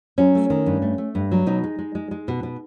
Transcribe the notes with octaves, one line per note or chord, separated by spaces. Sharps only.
F#3 C#4
A3
D#3
G2
A3
A3
G2
F#3
B2 D#4
G#3
G#3
G#3
G#3
B2
B2